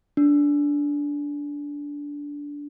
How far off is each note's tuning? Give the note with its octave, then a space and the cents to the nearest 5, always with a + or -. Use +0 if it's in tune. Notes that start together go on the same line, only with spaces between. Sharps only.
D4 -15